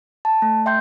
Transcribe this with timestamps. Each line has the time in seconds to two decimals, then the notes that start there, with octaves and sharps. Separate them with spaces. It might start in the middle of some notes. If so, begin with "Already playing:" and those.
0.25 A5
0.42 A3
0.66 E5 G5 C6 G6